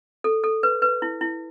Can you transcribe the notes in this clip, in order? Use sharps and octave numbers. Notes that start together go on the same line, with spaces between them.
A4
A4
B4
B4
E4
E4